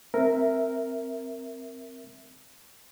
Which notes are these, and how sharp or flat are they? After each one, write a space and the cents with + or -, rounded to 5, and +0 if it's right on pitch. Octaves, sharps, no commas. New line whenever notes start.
C4 +0 A#4 +0 E5 +0